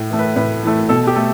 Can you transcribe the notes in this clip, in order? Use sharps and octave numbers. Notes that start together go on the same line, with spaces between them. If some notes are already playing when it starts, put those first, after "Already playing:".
Already playing: A2
E3 A3
B4
A2 B4
E3 A3
B2 A4
G4
A3